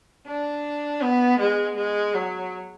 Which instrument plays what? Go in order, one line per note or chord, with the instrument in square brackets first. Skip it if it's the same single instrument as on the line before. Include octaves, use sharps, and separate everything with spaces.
[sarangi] D4
B3
G#3
G#3
F#3